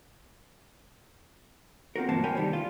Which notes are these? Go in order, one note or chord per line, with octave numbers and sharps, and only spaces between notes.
C4 F4 F#4 A#4
B1 G2 E3 A#3 C5 A5
A#4 C#5 G5 G#5 B5
C2 D#3 G3
F4